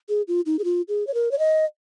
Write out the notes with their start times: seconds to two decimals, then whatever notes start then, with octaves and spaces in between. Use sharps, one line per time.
0.09 G#4
0.28 F4
0.46 D#4
0.59 G#4
0.64 F4
0.88 G#4
1.07 C#5
1.14 A#4
1.31 C#5
1.39 D#5